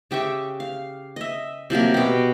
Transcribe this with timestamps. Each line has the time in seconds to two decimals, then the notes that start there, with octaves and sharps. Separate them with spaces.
0.11 C#3 G4 E5 C#6
0.60 F5
1.16 D#5 E5
1.70 C3 F3 F#3 A#3
1.94 B2 G4